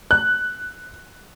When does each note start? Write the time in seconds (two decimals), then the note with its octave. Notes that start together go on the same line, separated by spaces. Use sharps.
0.11 F#6